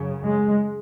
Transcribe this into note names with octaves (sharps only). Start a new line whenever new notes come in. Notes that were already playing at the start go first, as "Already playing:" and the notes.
Already playing: F#2 C#3
G#3